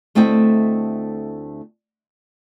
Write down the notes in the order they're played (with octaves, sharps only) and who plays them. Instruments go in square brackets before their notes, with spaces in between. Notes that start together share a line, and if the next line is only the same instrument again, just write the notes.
[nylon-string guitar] D2 A3 C4 E4 D#5 G5